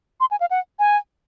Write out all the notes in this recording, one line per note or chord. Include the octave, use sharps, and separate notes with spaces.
C6
G#5
F5
F#5
G#5